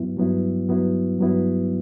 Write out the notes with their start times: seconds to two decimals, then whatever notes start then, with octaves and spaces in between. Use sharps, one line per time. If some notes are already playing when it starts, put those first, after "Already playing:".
Already playing: G2 F#3 B3 E4
0.17 G2 F#3 B3 E4
0.69 G2 F#3 B3 E4
1.19 G2 F#3 B3 E4